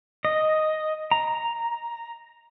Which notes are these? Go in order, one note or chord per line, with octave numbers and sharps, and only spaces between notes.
D#5
A#5